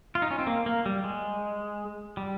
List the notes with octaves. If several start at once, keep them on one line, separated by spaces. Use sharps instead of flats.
F4
D#4
C#4
C4
A#3
A#3
G3
G#3
G3